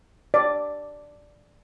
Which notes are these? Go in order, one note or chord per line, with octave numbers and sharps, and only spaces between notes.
D5